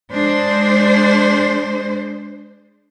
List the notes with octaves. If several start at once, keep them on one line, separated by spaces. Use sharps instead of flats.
G#3 D4 C5